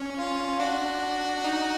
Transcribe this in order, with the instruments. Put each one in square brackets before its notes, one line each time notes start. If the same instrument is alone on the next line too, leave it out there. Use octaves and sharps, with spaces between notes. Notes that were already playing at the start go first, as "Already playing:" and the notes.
Already playing: [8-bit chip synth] C#4
[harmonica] F4
[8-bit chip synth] D4 [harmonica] F#4
[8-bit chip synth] D#4